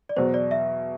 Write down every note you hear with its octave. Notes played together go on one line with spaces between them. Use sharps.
D5
E2 B2 F#3 C5
D5
E5